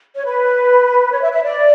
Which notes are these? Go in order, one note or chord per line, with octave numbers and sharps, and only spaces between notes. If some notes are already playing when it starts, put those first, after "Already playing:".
C#5
B4
C#5
E5
E5
D5